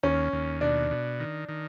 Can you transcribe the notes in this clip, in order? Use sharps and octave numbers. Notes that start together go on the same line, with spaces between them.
D#2 C#4
D#2
B2 D4
B2
D#3
D#3